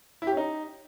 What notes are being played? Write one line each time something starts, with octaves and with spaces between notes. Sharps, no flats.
E4
G4
C#4
D#4